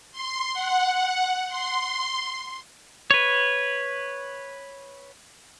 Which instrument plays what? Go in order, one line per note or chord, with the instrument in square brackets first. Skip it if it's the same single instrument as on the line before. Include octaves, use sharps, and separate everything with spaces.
[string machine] C6
F#5
C6
[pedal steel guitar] B4 C#5